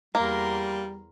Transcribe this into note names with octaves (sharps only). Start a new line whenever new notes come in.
E2 G3 A#3 A#4 C6